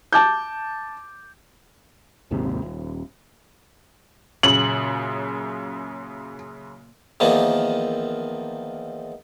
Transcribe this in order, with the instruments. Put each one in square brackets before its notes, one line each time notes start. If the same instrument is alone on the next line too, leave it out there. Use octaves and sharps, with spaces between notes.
[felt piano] A5 D6 G6
[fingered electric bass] A#1 D#2 G#2 C3
D#1
[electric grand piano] F#2 C#3 [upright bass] A#2 [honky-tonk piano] F#7
[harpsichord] E2 D#3 F3 A#3